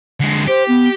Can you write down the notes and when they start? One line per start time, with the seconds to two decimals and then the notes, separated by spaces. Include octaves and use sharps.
0.20 D3 G#3
0.48 G4 C5
0.68 B3